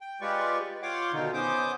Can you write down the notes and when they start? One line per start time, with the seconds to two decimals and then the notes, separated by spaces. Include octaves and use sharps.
0.01 G5
0.21 G#3 F4 G4 B4 D5 C#6
0.83 F4 C#5 F#5 G5 C6 D6
1.13 B2 D3 D#3 D#4 F4
1.34 B3 C#4 C5 D6 D#6 G6